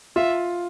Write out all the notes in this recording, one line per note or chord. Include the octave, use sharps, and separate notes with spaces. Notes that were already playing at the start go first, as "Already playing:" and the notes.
F4 E5